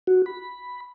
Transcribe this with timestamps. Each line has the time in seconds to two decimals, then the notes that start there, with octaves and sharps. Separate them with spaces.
0.07 F#4
0.26 B5